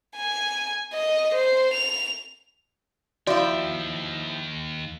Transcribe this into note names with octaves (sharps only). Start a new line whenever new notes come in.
G#5
D#5
C5
F7
D#2 F3 E4 F#4 D5 E5 F5 G5